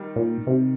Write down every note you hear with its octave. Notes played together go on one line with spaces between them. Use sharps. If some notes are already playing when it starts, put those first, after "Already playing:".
Already playing: D#3 G3
A#2
C3